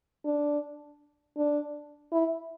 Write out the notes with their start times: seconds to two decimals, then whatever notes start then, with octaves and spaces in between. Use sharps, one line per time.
0.25 D4
1.37 D4
2.12 E4